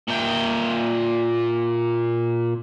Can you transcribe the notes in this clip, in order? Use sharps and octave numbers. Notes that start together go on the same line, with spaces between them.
A#2 G5